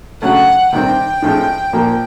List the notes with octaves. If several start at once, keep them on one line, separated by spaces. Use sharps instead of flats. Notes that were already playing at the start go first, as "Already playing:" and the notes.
C#3 F#3 A3 F#5
C3 D#3 G3 C4 G5
A2 F3 G#3 C4
A#2 F3 A#3